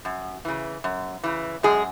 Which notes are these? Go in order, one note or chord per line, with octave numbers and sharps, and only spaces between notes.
F#2
C#3 E3
F#2
C#3 E3
F#2 G#3 G#4